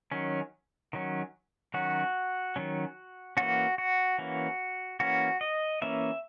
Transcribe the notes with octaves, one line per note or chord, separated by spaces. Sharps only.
D#3 F#3 C#4
D#3 F#3 C#4
D#3 F#3 C#4 F#4
D#3 F#3 C#4
E3 A#3 C#4 F#4
F#4
E3 A#3 C#4
E3 A#3 C#4 F#4
D#5
E3 A#3 C#4 E5